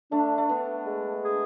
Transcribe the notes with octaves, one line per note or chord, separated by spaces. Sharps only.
A3 D4
A3
B3 D4
G#3
G#4